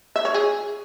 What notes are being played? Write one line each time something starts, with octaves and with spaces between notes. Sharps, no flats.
E5
C#5
G#4